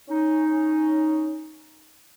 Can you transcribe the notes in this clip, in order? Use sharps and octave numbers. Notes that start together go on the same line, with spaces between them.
C#4 D#4